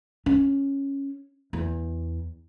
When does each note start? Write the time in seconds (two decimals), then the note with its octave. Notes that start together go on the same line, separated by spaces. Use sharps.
0.26 C#4
1.53 E2